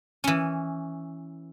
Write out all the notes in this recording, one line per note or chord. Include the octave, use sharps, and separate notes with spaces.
E3 C#4